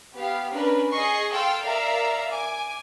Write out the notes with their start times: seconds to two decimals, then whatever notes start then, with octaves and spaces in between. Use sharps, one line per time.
0.15 B3 G4 F5
0.53 C#4 D4 A#4 B4
0.91 G#4 D#5 C#6 C7
1.32 A4 F5 G5 C6
1.63 A#4 D5 E5 F5 A#5
2.31 G#5 D6